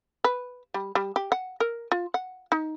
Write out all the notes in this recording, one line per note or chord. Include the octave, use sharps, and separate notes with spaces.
B4
G3
G3
G4
F#5
A#4
F4
F#5
D#4